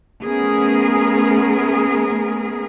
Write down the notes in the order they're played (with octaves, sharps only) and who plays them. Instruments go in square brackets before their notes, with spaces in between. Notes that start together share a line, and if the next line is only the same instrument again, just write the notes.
[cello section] A3 B3 C#4 G#4 A#4